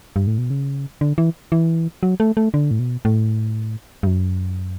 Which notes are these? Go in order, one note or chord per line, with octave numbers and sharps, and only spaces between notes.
G2
A2
B2
C#3
D3
E3
E3
F#3
A3
A3
D3
A2
B2
A2
G2
F#2